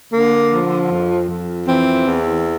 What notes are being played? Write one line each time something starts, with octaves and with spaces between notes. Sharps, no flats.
D3 A#3
F3
F2
F2
E3 C4
E2